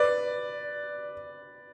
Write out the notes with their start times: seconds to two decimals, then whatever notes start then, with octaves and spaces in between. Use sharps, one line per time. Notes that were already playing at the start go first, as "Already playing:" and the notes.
Already playing: B4 D5